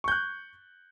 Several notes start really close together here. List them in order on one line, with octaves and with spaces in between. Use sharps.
C#6 G6 F#6